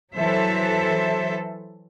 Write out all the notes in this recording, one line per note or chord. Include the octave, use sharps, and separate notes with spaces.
E3 F#3 A4 C5 E5